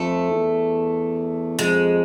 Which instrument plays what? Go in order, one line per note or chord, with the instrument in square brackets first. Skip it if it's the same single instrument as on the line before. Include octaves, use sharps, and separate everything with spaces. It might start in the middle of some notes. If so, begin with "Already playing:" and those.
Already playing: [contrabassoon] F2 [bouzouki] A3
[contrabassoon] E2
[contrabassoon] F2 [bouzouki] G#3